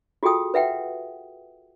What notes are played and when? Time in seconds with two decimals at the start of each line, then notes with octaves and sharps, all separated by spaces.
0.23 F4 F#4 G#4 A4 G5 D#6
0.54 B4 E5 F#5 G5